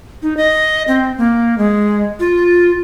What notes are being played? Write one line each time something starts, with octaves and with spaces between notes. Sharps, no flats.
D#4
D#5
C4
A#3
G#3
F4